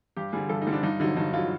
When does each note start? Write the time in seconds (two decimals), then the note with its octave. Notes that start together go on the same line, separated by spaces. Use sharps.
0.17 G2 G4
0.33 D3 G3 G#4
0.49 G2 A4
0.62 D#4
0.67 D3 G3
0.72 D4
0.83 G2 D#4
1.00 D3 F#3 D#4
1.16 G2 D#4
1.33 D3 F#3 F4